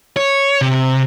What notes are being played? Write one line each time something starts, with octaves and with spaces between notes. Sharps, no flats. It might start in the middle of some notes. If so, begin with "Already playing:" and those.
C#5
C3